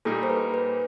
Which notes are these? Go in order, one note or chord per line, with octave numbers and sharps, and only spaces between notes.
A#2 G3 A#3 D#4 A4
C5
B4
B4